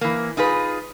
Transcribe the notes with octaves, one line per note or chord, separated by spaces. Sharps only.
E3 A#3
D#4 F4 G#4 B4